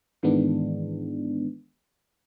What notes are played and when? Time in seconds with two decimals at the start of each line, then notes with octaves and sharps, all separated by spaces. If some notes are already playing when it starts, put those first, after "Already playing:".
0.23 G#2 D#3 E3 G#3 B3 D4